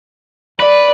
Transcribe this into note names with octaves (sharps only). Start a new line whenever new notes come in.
B4 D5